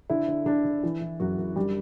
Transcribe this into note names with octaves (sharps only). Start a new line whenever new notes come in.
D3 E4
D3
D3 D4
D3
E3 E4
E3
F#2 F#3 F#4
F#2
D3 G3 G4